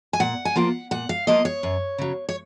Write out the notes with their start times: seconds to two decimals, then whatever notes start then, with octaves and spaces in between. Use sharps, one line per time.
0.13 G#5
0.20 A#2 F#5
0.45 G#5
0.56 F3 A#3 F4 F#5
0.91 A#2 F#5
1.09 F5
1.27 F3 A#3 F4 D#5
1.45 C#5
1.63 F#2
1.98 C#3 F#3
2.29 C#5